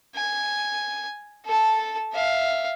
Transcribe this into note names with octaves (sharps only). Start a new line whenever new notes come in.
G#5
A4 A5
E5 F5